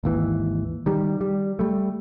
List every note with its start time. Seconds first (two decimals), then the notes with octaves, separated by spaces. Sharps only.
0.04 G#1 D#2 E3
0.86 D#3 G3
1.21 G3
1.59 G3 A3